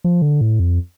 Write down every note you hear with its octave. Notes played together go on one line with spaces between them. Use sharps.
F3
D3
A2
F2